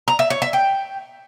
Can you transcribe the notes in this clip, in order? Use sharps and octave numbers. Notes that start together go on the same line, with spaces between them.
A#5
E5
C#5
E5
G5